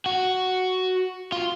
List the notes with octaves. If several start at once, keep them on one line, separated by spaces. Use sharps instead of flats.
F#4
F4